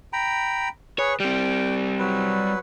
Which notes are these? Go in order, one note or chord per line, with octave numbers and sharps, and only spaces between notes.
G5 A#5 B5
G#4 B4 C#5
G3 C4 G5
F#3 B4